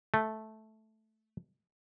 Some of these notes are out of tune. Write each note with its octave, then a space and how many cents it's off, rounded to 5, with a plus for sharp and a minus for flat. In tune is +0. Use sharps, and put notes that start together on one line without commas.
A3 -10